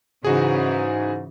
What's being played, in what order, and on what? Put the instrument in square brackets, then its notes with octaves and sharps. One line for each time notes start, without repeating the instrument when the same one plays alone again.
[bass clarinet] G#2 [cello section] C#3 E3 [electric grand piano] D#4 F#4 G#4